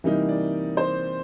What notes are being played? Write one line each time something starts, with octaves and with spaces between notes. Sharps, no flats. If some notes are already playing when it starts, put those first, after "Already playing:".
C3 E3 G3 A#3 D#4
D5
C5